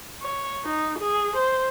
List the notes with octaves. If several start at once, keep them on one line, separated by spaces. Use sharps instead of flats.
C#5
D#4
G#4
C5